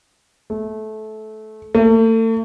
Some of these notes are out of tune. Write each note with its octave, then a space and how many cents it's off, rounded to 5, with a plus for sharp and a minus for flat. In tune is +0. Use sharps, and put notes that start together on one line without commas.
A3 -20
A3 +40